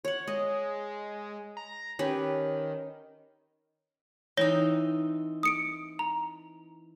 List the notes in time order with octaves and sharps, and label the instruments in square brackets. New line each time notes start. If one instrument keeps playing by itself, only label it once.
[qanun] C#5 F#5
[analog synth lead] G#3 [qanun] D#5
[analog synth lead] A#5
[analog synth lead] D#3 [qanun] C#4 G4 B4
[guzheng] E3 C4 D#4 [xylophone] C#5 A#6 G7
[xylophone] D#6 C#7 D7
A#5